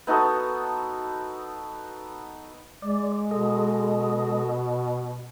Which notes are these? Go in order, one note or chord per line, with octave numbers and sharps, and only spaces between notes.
B3 D#4 F#4 A4
G#3 D5
B2 A4 D#5